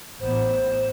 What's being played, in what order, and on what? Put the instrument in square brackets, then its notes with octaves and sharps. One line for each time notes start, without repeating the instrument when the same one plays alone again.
[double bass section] A1 B3 [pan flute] C5